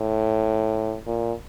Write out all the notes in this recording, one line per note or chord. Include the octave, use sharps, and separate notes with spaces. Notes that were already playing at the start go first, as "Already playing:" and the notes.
Already playing: A2
A#2